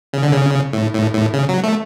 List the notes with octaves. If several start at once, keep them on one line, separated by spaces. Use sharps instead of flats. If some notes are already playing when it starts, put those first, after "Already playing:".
C#3
D3
C#3
A2
A2
A2
C#3
F#3
A3